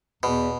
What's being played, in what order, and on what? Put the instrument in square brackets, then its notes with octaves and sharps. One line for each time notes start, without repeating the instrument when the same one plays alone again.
[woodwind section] E2 [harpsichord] B2